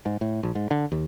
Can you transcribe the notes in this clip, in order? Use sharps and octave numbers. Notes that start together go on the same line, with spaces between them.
G#2
A2
A#1
G#2
D3
D#2